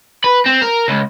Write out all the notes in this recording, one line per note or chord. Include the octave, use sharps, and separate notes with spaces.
B4
C4
A#4
C#2